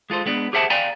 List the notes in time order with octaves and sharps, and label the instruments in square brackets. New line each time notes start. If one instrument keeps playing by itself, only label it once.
[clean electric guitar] G#3 F4 A4 C5
G#3 B3 D4
G4 G#4 C5 E5 F#5 A5
D5 F5 G5 G#5 A#5